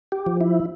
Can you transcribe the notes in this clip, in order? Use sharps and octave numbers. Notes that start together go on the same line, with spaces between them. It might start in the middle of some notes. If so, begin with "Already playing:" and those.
G4
F3
E4